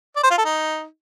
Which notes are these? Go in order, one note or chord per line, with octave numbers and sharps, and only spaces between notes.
D5
C5
F4
A4
D#4